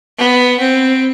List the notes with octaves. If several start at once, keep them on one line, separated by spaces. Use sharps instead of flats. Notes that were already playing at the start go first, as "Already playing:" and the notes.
B3
C4